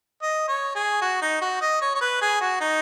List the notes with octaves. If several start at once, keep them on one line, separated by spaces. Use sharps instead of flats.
D#5
C#5
G#4
F#4
D#4
F#4
D#5
C#5
C#5
B4
G#4
F#4
D#4